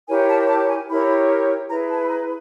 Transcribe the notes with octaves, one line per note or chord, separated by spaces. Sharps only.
E4 G4 A#4 C#5 G#5
A5
A5
G#5
E4 G4 A#4 C#5 B5
E4 G#4 B4 A#5
A5
B5
A#5